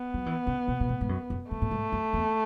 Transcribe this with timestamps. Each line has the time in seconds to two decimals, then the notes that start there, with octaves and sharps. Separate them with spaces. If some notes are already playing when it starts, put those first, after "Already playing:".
Already playing: B3
0.14 F#3
0.26 E3
0.47 C#3
0.68 B2
0.81 B2
0.89 A2
1.01 G#2
1.09 F#2
1.30 F#2
1.51 G#2 A3
1.62 A2
1.71 G#2
1.92 F#2
2.13 E2